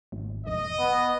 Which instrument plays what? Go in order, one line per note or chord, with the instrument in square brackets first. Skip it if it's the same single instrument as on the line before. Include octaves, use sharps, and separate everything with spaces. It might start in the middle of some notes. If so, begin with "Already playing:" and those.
[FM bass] G#1
[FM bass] E1 [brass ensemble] D#5
[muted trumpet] B3